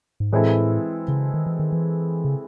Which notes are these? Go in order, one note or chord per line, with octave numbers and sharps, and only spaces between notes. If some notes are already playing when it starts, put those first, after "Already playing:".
G#2
A2 E3 G#3 C4 E4 A4
C#3
D#3
E3
D#3
E3
C#3